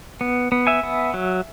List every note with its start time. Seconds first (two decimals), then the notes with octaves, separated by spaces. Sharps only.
0.21 B3
0.52 B3
0.67 E5 G#5
0.83 B3
1.14 F#3